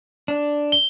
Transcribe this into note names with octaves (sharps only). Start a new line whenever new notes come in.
D4
G7